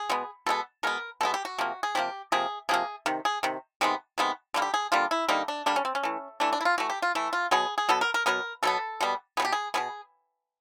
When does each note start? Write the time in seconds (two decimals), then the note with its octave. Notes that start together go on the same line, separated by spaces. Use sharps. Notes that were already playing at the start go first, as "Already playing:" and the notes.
Already playing: G#4
0.09 B2 G#3 B3
0.46 B2 G#3 B3 A4
0.83 B2 G#3 B3 A#4
1.21 B2 G#3 B3 A4
1.34 G4
1.45 F#4
1.58 C3 F3 A#3
1.83 G#4
1.95 C3 F3 A#3 G4
2.32 C3 F3 A#3 G#4
2.69 C3 F3 A#3 G#4
3.06 C3 D#3
3.25 G#4
3.43 C3 D#3
3.81 C3 D#3 G#3 B3
4.18 C3 D#3 G#3 B3
4.54 D3 G3 A#3
4.62 G4
4.74 G#4
4.92 D3 G3 A#3 F4
5.11 E4
5.28 D3 G3 A#3 D#4
5.48 D4
5.66 D3 G3 A#3 D4
5.76 C#4
5.85 C4
5.95 C#4
6.03 E3 A3
6.40 E3 A3 D4
6.53 D4
6.61 E4
6.65 F4
6.78 E3 A3 F#4
6.90 G4
7.02 F4
7.15 E3 A3
7.33 F4
7.51 B2 F#3 B3 G#4
7.78 G#4
7.89 B2 F#3 B3 A4
8.01 A#4
8.14 A#4
8.26 B2 F#3 B3 A#4
8.63 B2 F#3 B3 A4
9.01 B2 G3 B3
9.37 G3 B3 G#4
9.42 B2 G4
9.53 G#4
9.74 B2 G3 B3 G#4